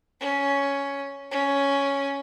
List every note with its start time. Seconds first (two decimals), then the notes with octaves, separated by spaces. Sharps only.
0.20 C#4
1.31 C#4